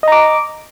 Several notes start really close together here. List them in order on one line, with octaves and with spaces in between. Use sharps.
D#5 A#5 D6